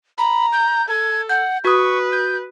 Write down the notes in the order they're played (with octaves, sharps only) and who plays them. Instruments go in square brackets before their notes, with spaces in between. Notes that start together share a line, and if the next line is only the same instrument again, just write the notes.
[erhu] A#5 [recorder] B5
[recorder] G6
[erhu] A4 [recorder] G#6
[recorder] F#5 [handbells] G6
[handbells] F#4 D#6 [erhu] B4 [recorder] C#6
[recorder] G6